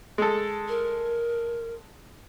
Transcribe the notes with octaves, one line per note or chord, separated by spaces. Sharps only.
G#3 A4
A#4